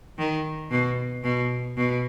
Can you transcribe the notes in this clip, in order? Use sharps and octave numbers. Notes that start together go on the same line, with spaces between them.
D#3
B2
B2
B2